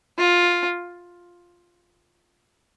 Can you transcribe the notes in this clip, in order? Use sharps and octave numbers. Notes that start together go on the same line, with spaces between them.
F4